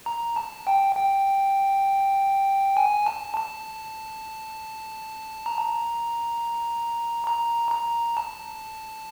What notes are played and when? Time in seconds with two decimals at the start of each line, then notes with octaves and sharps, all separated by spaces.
0.06 A#5
0.36 A5
0.67 G5
0.96 G5
2.77 G#5
3.06 A5
3.37 A5
5.46 A#5
7.27 A#5
7.71 A#5
8.17 A5